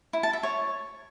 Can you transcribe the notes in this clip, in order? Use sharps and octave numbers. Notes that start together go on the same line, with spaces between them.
E4
A5
E5
C#5